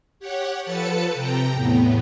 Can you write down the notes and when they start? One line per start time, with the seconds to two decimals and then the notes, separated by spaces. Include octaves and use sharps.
0.19 G4 C#5 F#5
0.63 F3 A4 B4 A5 A6 C#7
1.14 C3 G5 A#5
1.52 E2 A2 B3